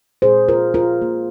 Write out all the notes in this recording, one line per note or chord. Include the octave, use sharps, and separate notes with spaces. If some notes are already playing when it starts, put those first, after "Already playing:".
A#2 G#3 G#4 C5
F4 A#4
F4 A#4
A#2 A#3